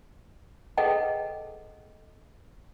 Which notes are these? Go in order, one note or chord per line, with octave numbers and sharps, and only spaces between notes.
G#4 A4 B4 D#5 F#5 G5